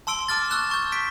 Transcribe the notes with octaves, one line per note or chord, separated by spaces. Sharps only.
A5 C6 E6 D7 G7
A5 D6 F6 A6
C#6 E6 F#6 E7
A5 C#6 G6
C#6 B6 D7